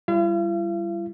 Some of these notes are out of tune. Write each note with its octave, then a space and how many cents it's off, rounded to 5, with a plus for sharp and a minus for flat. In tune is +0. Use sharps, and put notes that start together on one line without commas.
G3 +0 E4 +45 F5 -40